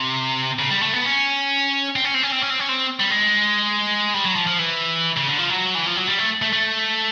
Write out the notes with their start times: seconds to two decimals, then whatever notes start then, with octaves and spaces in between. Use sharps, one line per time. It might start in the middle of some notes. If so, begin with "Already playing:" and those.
Already playing: C3
0.59 C#3
0.71 G3
0.82 A3
0.93 B3
1.05 C#4
1.96 C4
2.05 C#4
2.15 C4
2.23 C#4
2.32 C4
2.42 C#4
2.50 C4
2.60 C#4
2.69 C4
3.00 G3
3.10 G#3
4.14 G3
4.25 F#3
4.36 F3
4.47 F3
4.59 E3
5.17 C#3
5.28 D3
5.39 F3
5.50 F#3
5.75 E3
5.86 F3
5.97 F#3
6.08 G3
6.19 A3
6.42 A3
6.53 A3